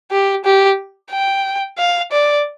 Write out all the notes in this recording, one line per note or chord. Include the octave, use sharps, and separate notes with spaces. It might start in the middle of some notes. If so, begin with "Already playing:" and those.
G4
G4
G5
F5
D5